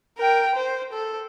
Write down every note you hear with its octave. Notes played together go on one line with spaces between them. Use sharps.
A#4 G5
C5
A4